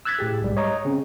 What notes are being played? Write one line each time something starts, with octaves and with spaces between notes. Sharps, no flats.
E6 F#6 G#6 A6 B6
A2 G4 G#4
B1 G#2 G3 G#3
C#5 D#5 A#5
C#3 C4 C#4